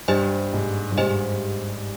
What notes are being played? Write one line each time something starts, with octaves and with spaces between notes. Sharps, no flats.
G2 G4 C5 D#5 G#5
G#2
G2
G#2 G4 C5 D#5 G#5